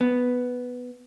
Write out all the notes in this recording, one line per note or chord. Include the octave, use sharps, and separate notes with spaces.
B3